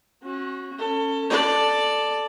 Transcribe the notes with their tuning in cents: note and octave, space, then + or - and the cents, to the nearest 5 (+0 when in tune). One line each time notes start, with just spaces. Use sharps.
C#4 -35 F#4 -10
C#4 -10 A4 +25
A4 +0 D5 +5